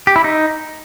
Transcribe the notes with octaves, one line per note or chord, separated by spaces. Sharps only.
G4
E4
D#4